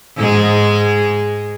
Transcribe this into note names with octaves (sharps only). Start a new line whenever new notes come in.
G#2 G#3 G#4